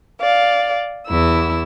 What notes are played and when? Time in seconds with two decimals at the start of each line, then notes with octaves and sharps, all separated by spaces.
0.21 D5 F5
1.08 E2 E4 E6